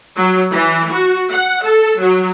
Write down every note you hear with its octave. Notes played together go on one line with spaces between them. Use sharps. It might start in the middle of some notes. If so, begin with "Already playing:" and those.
F#3
E3
F#4
F#5
A4
F#3